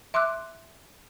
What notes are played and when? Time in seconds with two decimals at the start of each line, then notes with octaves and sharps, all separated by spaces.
0.14 E5 C6 D6 E6 F#6